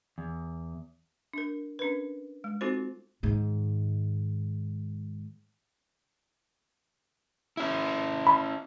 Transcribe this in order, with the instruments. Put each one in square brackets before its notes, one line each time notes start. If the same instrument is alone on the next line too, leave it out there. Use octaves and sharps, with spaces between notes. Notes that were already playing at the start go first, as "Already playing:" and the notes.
[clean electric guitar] E2
[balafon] D4 A#4
C#4 D4 A#4 B4
G#3
C4 D#4 F4 F#4 A4 C5
[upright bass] G#2 D#3
[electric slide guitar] C#4 E4
[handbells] B5